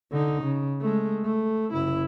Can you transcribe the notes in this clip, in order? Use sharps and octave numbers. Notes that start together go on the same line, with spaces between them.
D3 D#4
C#3
G#3 A3
A3
F#1 E4